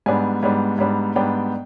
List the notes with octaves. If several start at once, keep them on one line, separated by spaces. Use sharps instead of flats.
G#2 G3 B3 D4 G#5
G#2 G3 B3 D4
G#2 G3 B3 D4
G#2 G3 B3 D4 G5